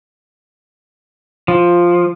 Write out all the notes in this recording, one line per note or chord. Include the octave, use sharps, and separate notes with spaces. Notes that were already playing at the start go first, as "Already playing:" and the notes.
F3